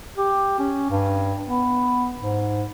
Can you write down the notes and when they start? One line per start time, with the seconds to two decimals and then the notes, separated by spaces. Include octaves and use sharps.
0.17 G4
0.59 C#4
0.90 G2
1.47 B3
2.22 G#2